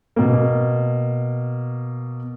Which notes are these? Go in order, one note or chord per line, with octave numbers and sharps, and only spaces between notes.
B2 A#3